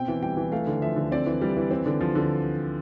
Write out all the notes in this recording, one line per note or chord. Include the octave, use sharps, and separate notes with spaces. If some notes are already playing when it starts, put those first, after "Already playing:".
Already playing: B2 C4 G5
E3
G3 G5
E3
A3 F5
D3
F3 E5
D3
C4 D5
E3
G3
E3
C4
D3
F3
D3